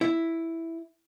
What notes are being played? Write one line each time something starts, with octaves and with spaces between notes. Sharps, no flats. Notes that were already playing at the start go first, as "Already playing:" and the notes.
E4